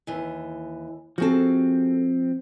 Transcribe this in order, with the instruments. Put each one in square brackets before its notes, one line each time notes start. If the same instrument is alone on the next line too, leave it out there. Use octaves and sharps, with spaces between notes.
[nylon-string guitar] D#2 E3
[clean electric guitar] F3 C4 [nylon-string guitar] F#4 G#4 A4